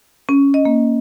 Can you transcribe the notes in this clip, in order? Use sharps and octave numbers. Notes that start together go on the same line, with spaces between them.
C#4
D#5
A#3